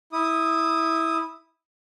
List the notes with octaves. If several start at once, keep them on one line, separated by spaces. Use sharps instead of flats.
E4 D#6